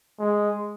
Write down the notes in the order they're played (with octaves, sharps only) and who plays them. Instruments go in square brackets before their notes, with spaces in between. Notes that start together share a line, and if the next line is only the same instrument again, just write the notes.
[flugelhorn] G#3